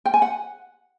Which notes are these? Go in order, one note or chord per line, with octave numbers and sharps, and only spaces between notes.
G5
G#5
F#5